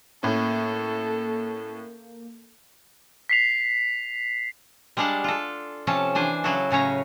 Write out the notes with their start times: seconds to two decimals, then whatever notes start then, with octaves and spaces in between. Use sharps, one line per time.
0.23 A2 A#3 C#4 A4
3.29 B6 C7 F7
4.97 G3 G#3 D4 F5 F#5 A5
5.24 F4 A4
5.87 C3 F3 C#4 A4 A5
6.15 E3 D4 C5 G#5
6.44 C#3 F#3 E4 F#4 A4
6.71 A2 C#3 C#4 C#5 A#5